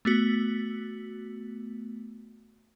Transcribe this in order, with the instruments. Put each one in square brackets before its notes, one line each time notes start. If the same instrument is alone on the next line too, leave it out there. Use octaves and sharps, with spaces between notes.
[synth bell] A3 B3 F#4